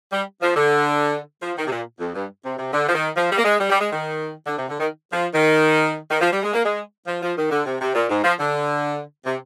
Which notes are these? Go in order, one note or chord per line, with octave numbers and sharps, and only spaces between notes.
G3
F3
D3
F3
D#3
C3
A#2
F2
G2
C3
C3
D3
F3
D#3
F3
G3
A#3
G#3
G3
G3
G#3
D#3
D3
C3
D3
D#3
F3
D#3
D#3
F3
G3
G#3
A#3
G#3
F3
F3
D#3
D3
C3
C3
A#2
G#2
F3
D3
C3